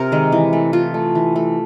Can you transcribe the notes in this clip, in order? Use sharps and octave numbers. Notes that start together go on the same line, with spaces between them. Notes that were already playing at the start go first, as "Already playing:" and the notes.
Already playing: C3 A#4 C5
D#3 G#3
E3
A3
E3 F4
A3
E3
A3